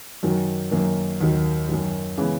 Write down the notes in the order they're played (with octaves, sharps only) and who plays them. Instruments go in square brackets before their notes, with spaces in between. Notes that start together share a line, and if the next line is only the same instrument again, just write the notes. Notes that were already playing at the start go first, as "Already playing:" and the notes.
[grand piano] F#2 D#3 F#3
F#2 D#3 A#3
D#2 D#3 F#3
F#2 D#3 F#3
C#3 E3 G#3 B3